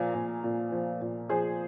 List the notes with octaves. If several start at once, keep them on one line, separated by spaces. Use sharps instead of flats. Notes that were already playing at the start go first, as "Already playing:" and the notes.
Already playing: A#2 F3 F5 G#5 A#5
A#2
A#2
F3
A#2
F3 G#4 C5